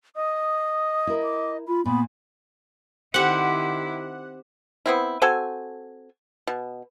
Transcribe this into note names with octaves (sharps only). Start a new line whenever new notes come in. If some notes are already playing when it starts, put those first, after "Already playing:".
D#5 D#6
E4 A#4
D6
F4 B5
A#2 B3 B5
D#3 C4 E4 G4 F#5
B3 C4 E4
C4 F#4 A4 G#5
B2